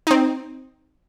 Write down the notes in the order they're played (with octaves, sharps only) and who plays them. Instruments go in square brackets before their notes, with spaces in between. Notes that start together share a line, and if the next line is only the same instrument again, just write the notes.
[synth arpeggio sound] C4 D#4